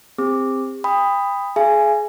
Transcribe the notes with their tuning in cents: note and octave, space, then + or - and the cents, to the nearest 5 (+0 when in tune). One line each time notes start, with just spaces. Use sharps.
C4 +0 G4 +45 D6 +0
G5 +35 B5 +10 D#6 +0
G#4 +25 F5 -45 G#5 +0